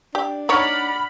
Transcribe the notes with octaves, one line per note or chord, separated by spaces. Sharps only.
D4 G4
D#4 C#5 D5 F#5 B5 F6